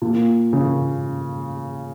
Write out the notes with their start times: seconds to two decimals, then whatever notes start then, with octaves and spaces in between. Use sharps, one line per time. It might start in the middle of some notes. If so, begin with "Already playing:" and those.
0.02 A#2
0.53 C#3